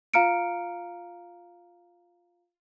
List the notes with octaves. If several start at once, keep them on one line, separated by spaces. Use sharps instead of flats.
F4 F5 A#5 F6 C#7 D7